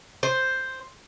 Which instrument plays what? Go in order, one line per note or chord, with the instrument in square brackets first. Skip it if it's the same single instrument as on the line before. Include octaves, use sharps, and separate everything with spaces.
[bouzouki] C5